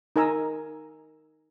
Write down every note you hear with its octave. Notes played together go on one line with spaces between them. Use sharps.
D#4 A#4 G#5 A#5 E6